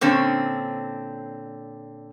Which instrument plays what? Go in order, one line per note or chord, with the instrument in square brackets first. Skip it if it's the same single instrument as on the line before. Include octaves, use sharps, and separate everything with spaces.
[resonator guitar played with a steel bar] A#2 D3 C4 C#4